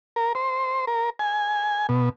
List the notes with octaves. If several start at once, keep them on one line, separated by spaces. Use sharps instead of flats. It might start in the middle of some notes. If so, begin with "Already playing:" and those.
A#4
C5
A#4
G#5
B2